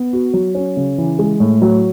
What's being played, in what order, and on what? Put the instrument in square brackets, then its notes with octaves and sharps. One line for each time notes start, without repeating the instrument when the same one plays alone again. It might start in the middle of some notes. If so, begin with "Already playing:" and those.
Already playing: [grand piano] B3
F#4
F#3
C#4
C#3
E3
G#3
A2
F#3